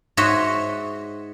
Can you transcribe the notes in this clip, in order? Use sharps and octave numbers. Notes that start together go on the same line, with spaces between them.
G#2 F#4 C5 C#5 D#5 E5